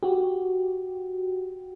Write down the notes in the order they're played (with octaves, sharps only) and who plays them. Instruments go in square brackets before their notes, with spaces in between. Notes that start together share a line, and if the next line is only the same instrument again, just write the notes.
[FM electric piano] F#4 G4